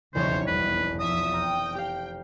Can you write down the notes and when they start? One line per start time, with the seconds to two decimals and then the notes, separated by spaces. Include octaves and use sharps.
0.15 F1 B1 E2 C#3 C5 C#5
0.47 G1 B4
1.00 F3 E5 D#6
1.34 G5 A#5 F6 D#7
1.75 G4 F5